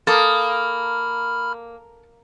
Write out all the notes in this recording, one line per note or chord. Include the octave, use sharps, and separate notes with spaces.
A#3 A4 B5 D#6 F6